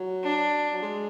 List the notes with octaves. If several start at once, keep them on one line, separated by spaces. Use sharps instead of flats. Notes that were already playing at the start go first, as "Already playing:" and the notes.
Already playing: F#3
D4
F#3
G#3